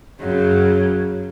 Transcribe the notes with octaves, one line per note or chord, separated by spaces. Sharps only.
F#2 C#3 F#3